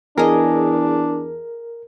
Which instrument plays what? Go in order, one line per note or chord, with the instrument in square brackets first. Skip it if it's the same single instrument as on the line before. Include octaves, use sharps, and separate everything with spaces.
[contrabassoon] E2 [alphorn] D4 [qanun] G#4 D#5 [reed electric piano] A#4